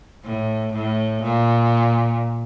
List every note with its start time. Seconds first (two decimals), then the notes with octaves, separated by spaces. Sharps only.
0.25 A2
0.73 A2
1.23 A#2